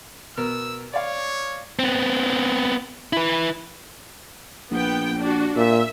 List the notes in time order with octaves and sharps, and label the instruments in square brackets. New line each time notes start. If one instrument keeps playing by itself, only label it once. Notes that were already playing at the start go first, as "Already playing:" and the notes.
[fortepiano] B2 A#4 [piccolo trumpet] E6
[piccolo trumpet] C#5 [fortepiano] D5 F5
[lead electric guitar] B3 C4
E4 B4
[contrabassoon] A#1 [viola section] B3 G5
[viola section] D4 F#4
[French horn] A#2 [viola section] E5